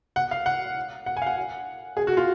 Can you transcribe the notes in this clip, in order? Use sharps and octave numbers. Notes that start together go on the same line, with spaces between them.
F#5
F5
F#5
F#5
G#5
F5
F#5
G#4
F#4
F4